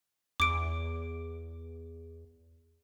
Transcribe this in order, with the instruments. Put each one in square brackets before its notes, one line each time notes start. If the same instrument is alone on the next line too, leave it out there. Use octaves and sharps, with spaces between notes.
[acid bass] E2 [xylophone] D6 D7